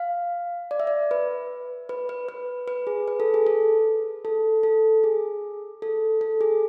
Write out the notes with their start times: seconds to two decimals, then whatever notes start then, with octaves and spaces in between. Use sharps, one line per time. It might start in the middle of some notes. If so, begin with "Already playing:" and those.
Already playing: F5
0.71 D5
0.80 E5
0.87 D5
1.11 B4
1.89 B4
2.09 B4
2.29 B4
2.68 B4
2.87 G#4
3.08 B4
3.20 A4
3.34 G#4
3.47 A4
4.25 A4
4.63 A4
5.04 G#4
5.82 A4
6.21 A4
6.41 G#4